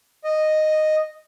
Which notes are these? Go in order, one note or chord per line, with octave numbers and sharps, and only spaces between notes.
D#5